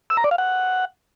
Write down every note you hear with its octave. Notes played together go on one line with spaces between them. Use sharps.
E6
A#5
D5
F5
F#5